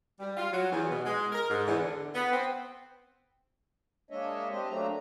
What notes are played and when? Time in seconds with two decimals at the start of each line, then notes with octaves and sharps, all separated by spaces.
0.18 G3
0.36 F4
0.52 F#3
0.71 E2
0.90 B2
1.04 G#3
1.32 A#4
1.49 G#2
1.67 E2
1.81 D3
2.14 B3
2.31 C4
4.11 G#3 A#3 D4 C#5 D#5 E5
4.50 C4 D4 G4 C5 D#5
4.69 F#3 A3 A#3 D4 A#5